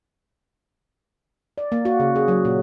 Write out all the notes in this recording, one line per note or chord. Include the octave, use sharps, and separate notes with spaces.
D5
A#3
F#4
C#3
G#4
F#3
A#2